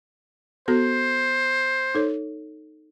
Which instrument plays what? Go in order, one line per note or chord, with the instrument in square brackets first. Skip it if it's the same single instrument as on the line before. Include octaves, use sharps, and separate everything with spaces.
[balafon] B3 F#4 A4 [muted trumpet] C5
[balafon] D#4 A4 C#5